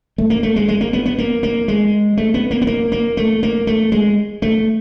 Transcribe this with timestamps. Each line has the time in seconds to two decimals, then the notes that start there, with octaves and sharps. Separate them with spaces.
0.18 A3
0.30 A#3
0.43 A3
0.56 G#3
0.68 G#3
0.81 A#3
0.93 B3
1.06 B3
1.18 A#3
1.43 A#3
1.68 G#3
2.17 A3
2.34 B3
2.51 A#3
2.62 B3
2.67 A#3
2.92 A#3
3.17 A3
3.43 A#3
3.67 A3
3.92 G#3
4.42 A3